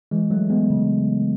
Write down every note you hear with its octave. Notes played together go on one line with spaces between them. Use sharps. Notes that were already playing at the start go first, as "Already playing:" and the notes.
E3 G#3
F#3 A3
G#3 B3
C#3